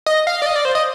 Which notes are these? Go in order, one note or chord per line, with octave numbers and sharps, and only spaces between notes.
D#5
F5
D5
D#5
D5
C5
D#5